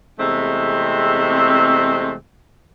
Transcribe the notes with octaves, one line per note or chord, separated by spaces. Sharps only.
E2 C3 G#3 A3 C4